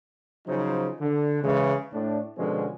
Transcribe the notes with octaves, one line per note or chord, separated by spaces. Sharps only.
C#3 F3 F#3 D#4 C5
D3
C#3 E3 G#3
A2 D4
B2 D3 F3 G#3 C4 C#4